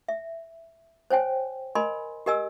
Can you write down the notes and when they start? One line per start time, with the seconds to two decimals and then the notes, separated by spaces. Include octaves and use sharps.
0.08 E5
1.10 C5 C#5 G5 G#5
1.75 A#4 D#5 G#5 B5 C6
2.26 G4 A#4 D#5 G#5 E6